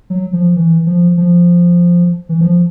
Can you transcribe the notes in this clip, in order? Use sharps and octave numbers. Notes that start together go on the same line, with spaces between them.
F#3
F3
E3
F3
F3
E3
F3